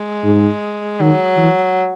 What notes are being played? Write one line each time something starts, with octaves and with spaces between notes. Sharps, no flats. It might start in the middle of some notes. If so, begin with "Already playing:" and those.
Already playing: G#3
G#2
D#3 F#3
E3